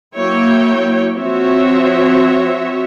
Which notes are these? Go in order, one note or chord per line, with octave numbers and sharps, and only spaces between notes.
F#3 A#3 E4 C#5 G5
F3 C4 F#4 C#5 E5